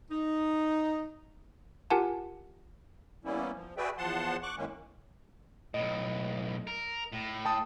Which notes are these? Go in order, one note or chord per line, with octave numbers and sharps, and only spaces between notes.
D#4
F4 G4 A#4 F#5 G#5 A5
E3 G3 A#3 B3 C#4 E4
F3
F#4 G#4 B4 D5 E5 G5
E2 F3 F#5 A5 C6
C#6 D6 F#6
F#2 A2 D#3 G#3 A#3 C#4
B1 A2 D#5
A#4
A2
G5 A5 D#6